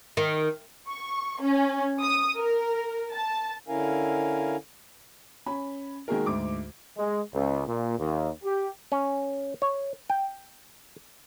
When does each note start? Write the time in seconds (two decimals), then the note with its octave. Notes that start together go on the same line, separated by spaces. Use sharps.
0.17 D#3
0.88 C#6
1.41 C#4
2.02 D#6
2.38 A#4
3.12 A5
3.68 D3 C#4 E4 A#4 F5 G#5
5.46 C#4 B5
6.08 D#3 G#3 A#3 F#4 G#4 A#4
6.26 D2 G#2 D6
6.97 G#3
7.33 C#2
7.67 A#2
7.99 D#2
8.44 G4
8.92 C#4
9.62 C#5
10.10 G5